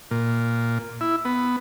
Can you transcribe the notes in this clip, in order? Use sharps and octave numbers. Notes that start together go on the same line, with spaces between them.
A#2
E4
B3